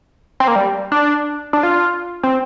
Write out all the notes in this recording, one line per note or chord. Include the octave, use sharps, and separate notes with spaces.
C4
A#3
G3
D4
D4
F4
C4